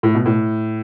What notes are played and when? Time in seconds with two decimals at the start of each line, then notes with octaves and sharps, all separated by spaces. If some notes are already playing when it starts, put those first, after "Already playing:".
0.03 A2
0.15 B2
0.26 A2